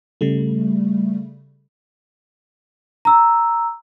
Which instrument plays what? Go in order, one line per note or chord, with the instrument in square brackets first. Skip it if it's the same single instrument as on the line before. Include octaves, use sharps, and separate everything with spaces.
[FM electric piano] C#3 G3 A3
[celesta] A#5 E6